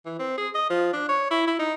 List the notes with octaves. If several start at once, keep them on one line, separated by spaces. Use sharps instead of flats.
E3
C4
G#4
D#5
F3
D4
C#5
E4
E4
D#4